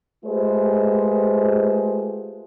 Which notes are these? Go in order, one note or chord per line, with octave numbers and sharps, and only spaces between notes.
G#3 A3 F4 G4 B4 C5